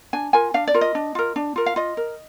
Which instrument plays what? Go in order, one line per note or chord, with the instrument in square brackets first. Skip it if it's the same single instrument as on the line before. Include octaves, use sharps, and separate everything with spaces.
[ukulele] D4 G#5
F4 A#4 G#5
D4 F5
D5
F4 A#4
D#5
D4
F4 A#4
D4
F4 A#4
F5
F4 D#5
A#4